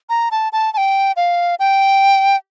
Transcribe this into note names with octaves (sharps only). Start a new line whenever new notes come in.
A#5
A5
A5
A5
G5
F5
G5